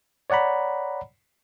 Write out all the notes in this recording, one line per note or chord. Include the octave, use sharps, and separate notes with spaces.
C#5 D5 F#5 A#5 B5